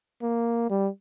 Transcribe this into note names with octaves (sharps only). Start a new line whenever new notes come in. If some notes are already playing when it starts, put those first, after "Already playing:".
A#3
G3